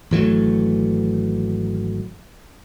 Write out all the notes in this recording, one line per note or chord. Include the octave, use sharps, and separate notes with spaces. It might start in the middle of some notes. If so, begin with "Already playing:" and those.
G#1 E3 F#3 A3